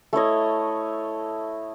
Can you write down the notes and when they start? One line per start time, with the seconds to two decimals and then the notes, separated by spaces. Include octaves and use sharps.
0.13 A3 E4 C#5 D#5